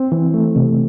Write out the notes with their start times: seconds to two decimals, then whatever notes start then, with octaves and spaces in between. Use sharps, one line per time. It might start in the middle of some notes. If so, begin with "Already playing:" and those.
Already playing: C4
0.12 E3
0.34 A3
0.56 C3